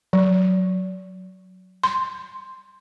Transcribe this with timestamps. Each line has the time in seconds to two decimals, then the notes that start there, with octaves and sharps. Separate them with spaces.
0.13 F#3
1.84 C6